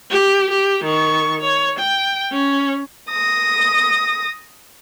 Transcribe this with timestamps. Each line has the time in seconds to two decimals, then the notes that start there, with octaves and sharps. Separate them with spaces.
0.10 G4
0.50 G4
0.84 D#3 C#6
1.41 C#5
1.79 G5
2.32 C#4
3.11 D#6 A#6